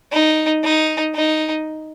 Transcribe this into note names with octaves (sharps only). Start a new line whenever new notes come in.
D#4
D#4
D#4